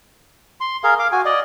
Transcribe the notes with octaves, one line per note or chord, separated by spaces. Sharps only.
C6
G#4 A#4 F5
F5 D6
F#4 G#5
D5 D#5